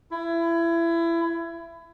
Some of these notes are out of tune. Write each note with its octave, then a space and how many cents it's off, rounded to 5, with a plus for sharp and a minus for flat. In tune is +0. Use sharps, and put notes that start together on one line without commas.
E4 +25